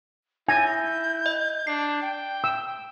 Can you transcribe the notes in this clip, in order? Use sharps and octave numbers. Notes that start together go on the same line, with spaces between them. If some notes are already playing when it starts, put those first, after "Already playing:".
D#4 E4 G#5 G6 A#6
D#5
D4 C7
G5
E6